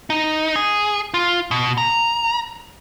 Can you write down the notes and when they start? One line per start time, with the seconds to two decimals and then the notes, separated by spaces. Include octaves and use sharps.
0.10 D#4
0.56 G#4
1.14 F4
1.51 B2
1.78 A#5